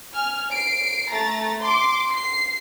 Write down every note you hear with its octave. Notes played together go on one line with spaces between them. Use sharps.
G#5 F6
C7 D7
A3 A#5 A6
C6 D6
C7